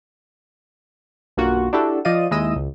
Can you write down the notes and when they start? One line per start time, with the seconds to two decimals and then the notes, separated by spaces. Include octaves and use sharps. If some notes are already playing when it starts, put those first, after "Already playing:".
1.37 B1 G2 A#3 F4 F#4
1.73 D4 E4 F#4 G4 A4
2.05 F3 D5 D#5 F5 D#7
2.31 D#2 G#3 E4 D#5 E6 D#7
2.56 C#2